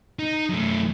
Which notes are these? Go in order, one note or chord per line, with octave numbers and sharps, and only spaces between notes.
D#4
F#2 A3